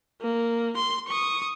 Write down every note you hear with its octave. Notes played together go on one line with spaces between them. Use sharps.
A#3
C6
C#6 D#6